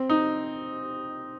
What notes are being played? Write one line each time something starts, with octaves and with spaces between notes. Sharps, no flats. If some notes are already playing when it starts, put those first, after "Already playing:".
Already playing: C4
D#4